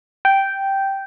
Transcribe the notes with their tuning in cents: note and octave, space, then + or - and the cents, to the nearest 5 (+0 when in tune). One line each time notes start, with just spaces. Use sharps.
G5 -5